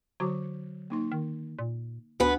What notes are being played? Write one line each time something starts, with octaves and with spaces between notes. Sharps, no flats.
D3 F#3 F#4 D6
A#3 D#4 C6
D#3
A#2
D2 B3 D4 F#4 B4 G#5